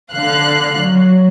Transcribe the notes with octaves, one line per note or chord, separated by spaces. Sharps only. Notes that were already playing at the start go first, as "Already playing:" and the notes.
D3 F5 F#6
F#3